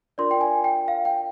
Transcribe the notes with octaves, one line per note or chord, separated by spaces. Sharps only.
D4 F4 A#4 D5 C6
G5
G#5
G5
F5
G5